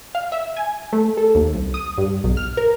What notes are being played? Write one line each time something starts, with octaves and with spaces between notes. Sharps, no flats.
F5
E5
G#5
A3
A4
D#2
C2
D#6
G2
B1
F6
A#4